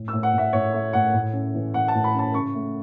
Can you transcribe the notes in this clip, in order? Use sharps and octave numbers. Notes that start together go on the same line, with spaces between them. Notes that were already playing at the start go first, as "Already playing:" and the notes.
Already playing: A2
E6
A2
F#5
A2 E5
A2 C#5
A3 E5
A2 F#5
A2
C#4
E3
E3 F#5
A5
A2
B5
C#4 A5
C#3 C#6
A3